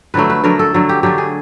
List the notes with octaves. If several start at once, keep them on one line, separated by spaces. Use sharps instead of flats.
D3 F#3 A3 B4
B4
D3 F#3 A3 A#4
A4
D3 F#3 A3
G4
D3 F#3 A3 G4
G#4